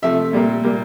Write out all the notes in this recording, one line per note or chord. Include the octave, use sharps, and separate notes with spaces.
C3 F3 A3 E5
A#2 G3 A#3
A#2 G3 A#3